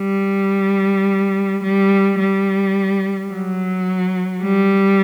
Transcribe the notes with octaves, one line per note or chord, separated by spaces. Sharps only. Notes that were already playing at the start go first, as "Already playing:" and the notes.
Already playing: G3
G3
G3
F#3
G3